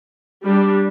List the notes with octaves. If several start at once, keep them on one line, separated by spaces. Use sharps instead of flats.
G3 D4